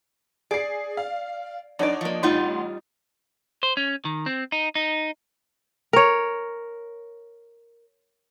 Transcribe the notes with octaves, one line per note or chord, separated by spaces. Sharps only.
G#4 D5 C7
F5
F#2 D4 D#4 C#5 D5
F3 A#3
A1 G3 D#4 F4 F#5 C6
C5
C#4
D#3
C4
D#4
D#4
A#4 C#5